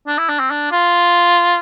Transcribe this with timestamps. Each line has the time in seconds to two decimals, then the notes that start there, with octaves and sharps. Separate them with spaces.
0.07 D4
0.18 E4
0.29 D4
0.40 C4
0.51 D4
0.72 F4